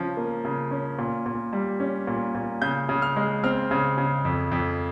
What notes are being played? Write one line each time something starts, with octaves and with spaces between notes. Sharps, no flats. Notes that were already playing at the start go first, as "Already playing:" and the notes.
Already playing: C#3 F3 C#4
A#3
C#3
C#4
A#2
A#2
G3
C#4
A#2
A#2
C#3 G6
C#3
F6
G#3
C4 F6
C#3
C#3
F2
F2